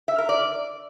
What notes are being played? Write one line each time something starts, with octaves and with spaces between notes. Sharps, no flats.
E5
A#4
D5